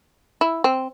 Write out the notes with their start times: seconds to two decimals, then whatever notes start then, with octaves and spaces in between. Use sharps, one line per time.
0.41 E4
0.64 C4